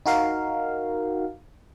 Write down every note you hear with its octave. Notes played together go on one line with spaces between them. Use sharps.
D#4 F#4 A#4 F5